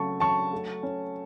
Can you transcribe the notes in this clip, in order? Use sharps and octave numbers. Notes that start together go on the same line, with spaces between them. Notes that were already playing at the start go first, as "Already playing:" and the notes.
Already playing: C#3 F#3 A3 A5 C#6
F#3 A5 C#6
A3
C#4